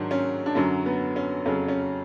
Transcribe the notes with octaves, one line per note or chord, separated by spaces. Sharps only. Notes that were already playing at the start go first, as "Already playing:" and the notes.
Already playing: G#2 D#3 F#3 D4
C#4
D4
F#2 D3 F#3 C#4
B3
C#4
F2 C#3 F#3 C#4
C#4